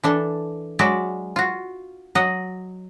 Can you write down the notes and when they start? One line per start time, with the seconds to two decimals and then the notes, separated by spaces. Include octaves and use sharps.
0.04 E3 D4 A4
0.79 F#3 G#3 F#4 D5 E5
1.36 F4 F#4
2.15 F#3 D#5 F#5